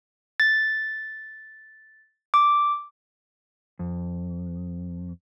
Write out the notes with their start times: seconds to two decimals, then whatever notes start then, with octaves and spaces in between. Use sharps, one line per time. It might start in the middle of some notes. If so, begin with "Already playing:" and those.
0.40 A6
2.34 D6
3.79 F2